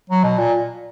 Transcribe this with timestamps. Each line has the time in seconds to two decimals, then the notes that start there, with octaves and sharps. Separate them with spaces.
0.10 F#3
0.23 B2
0.38 A#2